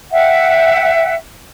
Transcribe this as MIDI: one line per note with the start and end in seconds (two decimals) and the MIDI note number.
0.11 1.14 76
0.11 1.14 78
0.11 1.14 79